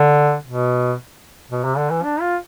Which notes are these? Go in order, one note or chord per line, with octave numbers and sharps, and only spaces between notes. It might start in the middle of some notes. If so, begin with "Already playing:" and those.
Already playing: D3
B2
B2
C3
D3
E3
D4
F4